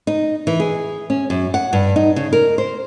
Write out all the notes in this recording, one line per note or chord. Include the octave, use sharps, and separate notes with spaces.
D#4
E3
G#4
C#4
F#2
F#5
G2
D#4
C#3
A#4
C5